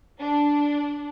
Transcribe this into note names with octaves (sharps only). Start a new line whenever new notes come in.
D4